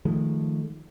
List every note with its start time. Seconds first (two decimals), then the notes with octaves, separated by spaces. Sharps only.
0.05 D#3 F3 G#3 A3